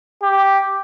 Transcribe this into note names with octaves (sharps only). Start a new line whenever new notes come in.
G4